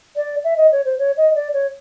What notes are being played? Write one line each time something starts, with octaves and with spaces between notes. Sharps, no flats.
D5
E5
D#5
C#5
C5
C#5
D#5
D5
C#5